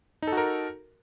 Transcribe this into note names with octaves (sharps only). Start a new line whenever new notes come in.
D#4 F#4 A4 A#4